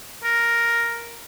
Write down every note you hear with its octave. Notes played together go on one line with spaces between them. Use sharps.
A#4